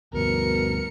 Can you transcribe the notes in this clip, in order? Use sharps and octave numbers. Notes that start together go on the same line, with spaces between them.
D2 G2 B2 A#4 C#7